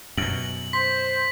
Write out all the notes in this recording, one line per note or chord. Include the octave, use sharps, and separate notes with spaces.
F#2 B2 F#7
C5 B6